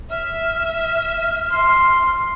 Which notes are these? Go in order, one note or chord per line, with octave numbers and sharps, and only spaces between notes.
E5 F6
C6